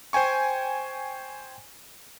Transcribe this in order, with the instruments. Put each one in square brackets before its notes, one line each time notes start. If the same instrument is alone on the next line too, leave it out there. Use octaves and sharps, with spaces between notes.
[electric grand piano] C5 G5 G#5 C#6